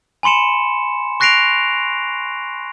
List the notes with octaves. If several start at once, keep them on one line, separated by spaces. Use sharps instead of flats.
G#5 B5 C6 C#7 E7
C#6 F#6 A#6 C7 D7 F7